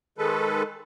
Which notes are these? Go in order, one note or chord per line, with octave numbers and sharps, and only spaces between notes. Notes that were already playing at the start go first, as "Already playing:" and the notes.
D#3 G#3 A4 B4